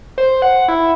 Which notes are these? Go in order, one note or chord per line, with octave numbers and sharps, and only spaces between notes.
C5
F#5
E4